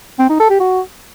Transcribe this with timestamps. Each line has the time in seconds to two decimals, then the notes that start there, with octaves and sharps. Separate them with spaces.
0.19 C4
0.29 D#4
0.40 A4
0.50 G4
0.60 F#4